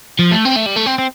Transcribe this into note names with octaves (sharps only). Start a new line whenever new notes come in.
F3
A3
C4
A3
G3
A3
C4
C4